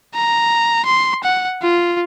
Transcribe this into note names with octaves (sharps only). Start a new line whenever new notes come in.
A#5
C6
F#5
F4